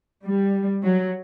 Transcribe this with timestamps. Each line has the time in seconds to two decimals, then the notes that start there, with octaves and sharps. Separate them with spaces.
0.24 G3
0.84 F#3